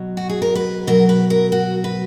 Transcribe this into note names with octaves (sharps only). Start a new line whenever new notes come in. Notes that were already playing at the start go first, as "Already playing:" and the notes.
Already playing: B2 F#3
F#4
G#4
A#4
B4
B2 F#3 A#4
B4
A#4
F#4
B4